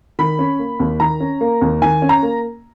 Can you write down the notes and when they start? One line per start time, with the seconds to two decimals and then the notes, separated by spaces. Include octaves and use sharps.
0.19 D#3 B5
0.39 C#4
0.59 A#3
0.80 D#2
1.00 D#3 A#5
1.20 C#4
1.41 A#3
1.61 D#2
1.82 D#3 G#5
2.02 C#4
2.09 A#5
2.23 A#3